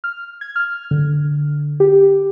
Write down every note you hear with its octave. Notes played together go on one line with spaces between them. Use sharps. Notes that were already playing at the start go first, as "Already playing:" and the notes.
F6
G#6
F6
D3
G4